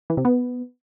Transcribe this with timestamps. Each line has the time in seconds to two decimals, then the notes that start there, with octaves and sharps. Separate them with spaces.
0.10 E3
0.17 C3
0.25 B3